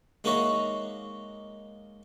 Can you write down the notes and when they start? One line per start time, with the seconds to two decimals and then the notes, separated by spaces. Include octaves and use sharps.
0.24 G#3 A#3 D#4 F#4 C#5 E5